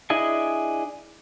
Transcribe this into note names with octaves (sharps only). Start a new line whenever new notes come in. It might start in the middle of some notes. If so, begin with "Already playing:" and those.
D4 E4 G#4 D#5 G#5